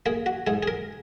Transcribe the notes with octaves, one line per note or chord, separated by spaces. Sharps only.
A#3 G#4
F#4
G#2 G#4
G#4
A#4